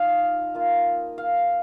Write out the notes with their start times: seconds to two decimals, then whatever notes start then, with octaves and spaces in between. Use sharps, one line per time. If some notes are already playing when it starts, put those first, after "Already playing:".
Already playing: F3 D#4 D#5 F5
0.55 A#3 F4
1.18 F5